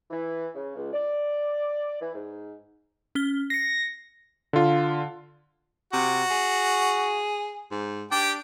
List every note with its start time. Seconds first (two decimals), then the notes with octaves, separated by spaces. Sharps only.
0.11 E3
0.54 C#3
0.76 C#2
0.93 D5
2.00 E3
2.15 G#2
3.15 C#4 F6 G7
3.50 A#6 C7 C#7
4.53 D3 F4
5.93 C3 F#4
6.30 G#4
7.71 G#2
8.11 D4 G4 G5